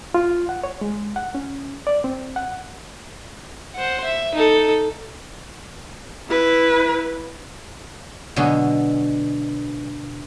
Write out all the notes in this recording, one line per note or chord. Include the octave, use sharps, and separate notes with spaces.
F4
F#5
C#5
G#3
F#5
C#4
D5
C4
F#5
C5 F#5
E5
D#4 A4
E4 B4
B2 D3 F#3 G#3 B3